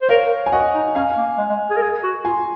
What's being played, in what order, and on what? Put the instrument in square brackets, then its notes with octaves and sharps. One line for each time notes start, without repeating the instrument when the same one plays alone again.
[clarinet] C5
[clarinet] A#4 [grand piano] C#5 F5
[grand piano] G#5
[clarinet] F#4 [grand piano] D#5 F#5
[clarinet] D#4
[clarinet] C#4 [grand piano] F5 G#5
[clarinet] A#3
G#3
G#3
G#4
A#4
G#4
F#4
[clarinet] F4 [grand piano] G#5 C6